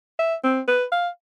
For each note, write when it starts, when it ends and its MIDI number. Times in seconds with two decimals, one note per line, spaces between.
0.19 0.35 76
0.44 0.60 60
0.68 0.85 71
0.92 1.08 77